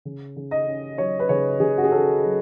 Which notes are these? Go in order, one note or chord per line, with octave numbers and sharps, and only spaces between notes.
C#3
C#3
D#5
C#4
F#3 C#5
B4
C#3 C#5
C#3 G#4
F#4
G#4
C#4 A4
F#3